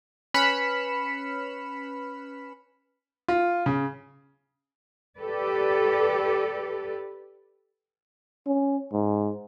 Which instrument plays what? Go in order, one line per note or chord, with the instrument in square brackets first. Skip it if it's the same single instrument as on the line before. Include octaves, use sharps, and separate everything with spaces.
[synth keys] C#4 B4 B5 F6 C#7 E7
[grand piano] F4
C#3
[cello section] G4 A4 B4 D5
[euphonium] C#4
G#2